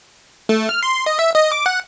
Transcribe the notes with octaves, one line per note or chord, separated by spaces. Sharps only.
A3
F6
C6
D#5
E5
D#5
D6
F#5